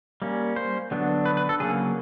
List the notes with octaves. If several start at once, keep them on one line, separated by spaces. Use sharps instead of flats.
G3 A#3 C#4
C5
D3 F#3 B3 D4
B4
B4
A4
C#3 F#3 A#3 G#4